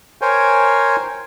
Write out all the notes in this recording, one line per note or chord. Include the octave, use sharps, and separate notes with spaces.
A#4 C5 C#5 G5 G#5